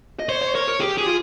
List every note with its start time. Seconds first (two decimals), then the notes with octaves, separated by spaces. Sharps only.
0.19 D#5
0.29 C5 C#5
0.42 C#5
0.55 A#4 C#5
0.68 A#4
0.80 G4 G#4
0.98 G4 G#4
1.06 F4